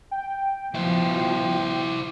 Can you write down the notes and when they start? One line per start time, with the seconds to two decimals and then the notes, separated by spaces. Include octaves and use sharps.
0.11 G5
0.74 B2 F3 E4 C5